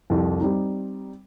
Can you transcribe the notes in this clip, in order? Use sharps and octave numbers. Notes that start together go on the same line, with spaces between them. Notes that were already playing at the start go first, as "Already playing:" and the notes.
C2 F2
G3 C4 D#4